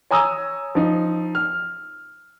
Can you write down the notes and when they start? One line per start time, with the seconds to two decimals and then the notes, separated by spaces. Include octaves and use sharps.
0.11 C#5 G#5 A#5 D#6 E6
0.75 F3 D#4
1.35 F6